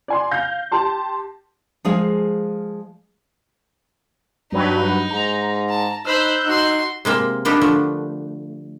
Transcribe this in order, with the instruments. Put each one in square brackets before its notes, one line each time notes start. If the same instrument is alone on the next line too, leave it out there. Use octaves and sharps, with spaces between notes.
[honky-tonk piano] D5 G#5 C6
F5 G6 A#6
G4 A5 C6
[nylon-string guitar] F3 G#3 G#4 F5
[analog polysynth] G2 F#3 B4 [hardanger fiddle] D#4
[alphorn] G#2 [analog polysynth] A#5
[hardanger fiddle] A5
[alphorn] D#4 [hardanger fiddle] C5 B5 [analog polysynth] E6 F#6 G6
[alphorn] D#4 [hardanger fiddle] F#4 C6
[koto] C3 G#3 A#3 E5
A#3 B3 D4 D#4 G4
D3 F3 A3